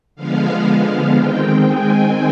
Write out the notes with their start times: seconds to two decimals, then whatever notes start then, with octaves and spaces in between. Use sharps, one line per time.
0.16 D3 F3 G#3 B3 F5
1.16 D#3 G#3 C4 G5
1.66 G#5